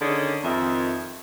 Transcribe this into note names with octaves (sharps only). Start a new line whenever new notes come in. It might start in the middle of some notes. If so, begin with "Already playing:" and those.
D3 D#3 C#4 D#4 G#4 D5
F2 D#3 E5